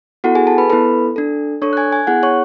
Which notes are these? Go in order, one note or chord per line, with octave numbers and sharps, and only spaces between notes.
B3 E4 F#4 A4 F#5
G#4 G#5
A4 A5
B4 B5
B3 E4 A4 B4 B5
D4 A4
D4 A4 C#5 C#6
F#6
G#5 G#6
G#5 G#6
B3 E4 G#4 F#5 F#6
C#5 C#6